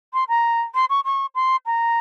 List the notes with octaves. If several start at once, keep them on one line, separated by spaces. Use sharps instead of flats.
C6
A#5
C6
C#6
C#6
C6
A#5